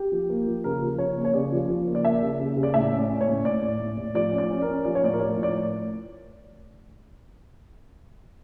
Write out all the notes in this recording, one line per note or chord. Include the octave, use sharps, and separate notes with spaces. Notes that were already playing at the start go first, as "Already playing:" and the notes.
Already playing: G4
F3
A#3
F3
C#3 A#4
F3
C#3 C#5
A#3
C#5
C#3 D5
F3
F3
A#3
D5
A#3 E5
C#3
C#3
C#3
D5
A2 E5
C#4
D5
C#4
C#5
A2
A2 D5
A2
A2
A2
F3 D5
C#4
D5
C#4
C#4 A#4
F3 D5
C#5
A2 D5
A#4
F3 C#5
A2
D5